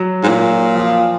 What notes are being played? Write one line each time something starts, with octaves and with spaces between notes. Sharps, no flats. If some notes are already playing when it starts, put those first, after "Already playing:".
Already playing: F#3
G#2
A#2
F3